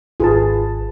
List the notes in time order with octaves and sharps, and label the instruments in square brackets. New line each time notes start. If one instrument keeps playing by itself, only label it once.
[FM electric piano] G#1 B4 A5 [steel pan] F4 G#4